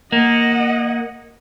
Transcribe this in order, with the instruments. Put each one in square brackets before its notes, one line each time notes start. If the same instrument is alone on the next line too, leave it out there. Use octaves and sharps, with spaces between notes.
[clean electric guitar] A#3 [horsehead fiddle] D#5 F#5